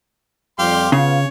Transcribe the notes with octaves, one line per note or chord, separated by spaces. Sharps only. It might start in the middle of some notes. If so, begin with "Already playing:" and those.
F2 G3 G4 F5 C6
C#3 B3 F4 C#5